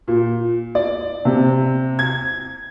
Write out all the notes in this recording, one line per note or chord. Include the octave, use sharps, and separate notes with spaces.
A#2
D5
C3
G#6